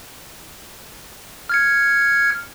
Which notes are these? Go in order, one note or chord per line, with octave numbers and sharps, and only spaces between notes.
F6 G#6 C#7